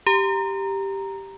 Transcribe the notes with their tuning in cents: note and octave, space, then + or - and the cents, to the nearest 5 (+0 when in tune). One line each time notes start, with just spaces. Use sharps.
G4 +0 A#5 +0